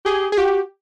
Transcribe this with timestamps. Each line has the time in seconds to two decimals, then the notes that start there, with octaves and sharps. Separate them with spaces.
0.05 G4 G#4
0.32 G#4
0.37 F#4 G4